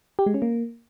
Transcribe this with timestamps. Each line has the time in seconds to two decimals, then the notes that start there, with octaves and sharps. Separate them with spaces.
0.19 G4
0.26 G#3
0.34 C#4
0.42 A#3